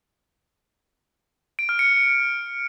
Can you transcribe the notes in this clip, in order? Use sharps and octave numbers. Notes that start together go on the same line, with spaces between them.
D7
F6
C#7